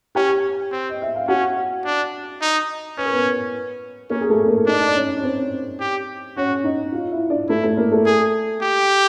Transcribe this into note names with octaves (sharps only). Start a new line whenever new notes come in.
C#4 G4 G5
C4
D#5
E5
F5
C#4 F#4 F#5
D4
D#4
C#4 B4
A#4
B3 B4
A#3 C#4 A#4
G#4
A3 A4
A#3 A#4
D4 D#4 D#5
D#5
D5
C#4 C#5
C#5
C4 C5
G4
C#4 F#4 C#5
D#4 D#5
F4 F5
E4 E5
D4 D5
A3 E4 A4
A3 A4
A#3 A#4
A3 A4
G#4
G4